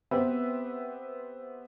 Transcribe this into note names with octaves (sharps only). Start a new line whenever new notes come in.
B3 C4 G4 B4 C5 E5